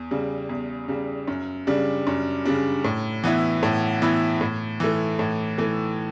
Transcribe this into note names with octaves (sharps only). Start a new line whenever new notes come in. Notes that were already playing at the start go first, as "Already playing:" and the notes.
Already playing: E2
C#3 G3
E2
C#3 G3
F#2
C#3 G3 D4
F#2
C#3 G3 D4
A2
E3 B3 E4
A2
E3 B3 E4
A2
E3 A3
A2
E3 A3